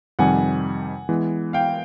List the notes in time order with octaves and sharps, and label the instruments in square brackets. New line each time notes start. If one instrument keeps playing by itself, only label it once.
[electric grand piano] F2 C3 D#3 G3 [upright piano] F#5 G#5
[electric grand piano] E3 G#3 B3
[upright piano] F5 G5